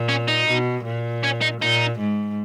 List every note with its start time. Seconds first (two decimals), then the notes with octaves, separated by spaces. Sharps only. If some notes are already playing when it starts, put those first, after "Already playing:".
Already playing: A#2
0.09 C#4
0.28 D#4
0.47 B2
0.85 A#2
1.24 C#4
1.42 D#4
1.61 A#2 D#4
2.00 G#2